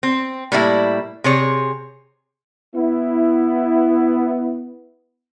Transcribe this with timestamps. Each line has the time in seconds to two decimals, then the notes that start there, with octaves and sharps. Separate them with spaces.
0.03 C4
0.52 A2 G3 A#3 E4
1.24 C3 G#4 C#5
2.76 B3 E4